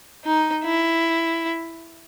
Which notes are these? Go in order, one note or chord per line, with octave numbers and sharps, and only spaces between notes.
D#4
E4